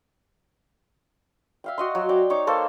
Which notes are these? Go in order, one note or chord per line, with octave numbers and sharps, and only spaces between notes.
E5 F5 G5
F#4 D#5 C6
F#3
D5 G5
D#4 C#5 D6
A#3 A4 C5 C#5